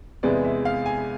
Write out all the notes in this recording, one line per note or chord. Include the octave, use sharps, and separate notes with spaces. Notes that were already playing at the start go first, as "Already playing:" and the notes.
E2 C3 E3 G#3 B3 D5
E5
F5
G#5